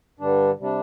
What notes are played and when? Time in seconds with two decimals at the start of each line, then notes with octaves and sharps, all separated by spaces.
0.19 G2 D3 G3 D4
0.59 C3 G3 D4